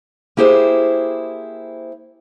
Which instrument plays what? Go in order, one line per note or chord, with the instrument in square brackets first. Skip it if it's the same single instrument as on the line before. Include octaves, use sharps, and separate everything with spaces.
[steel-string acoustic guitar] A#3 E4 G4 G#4 C5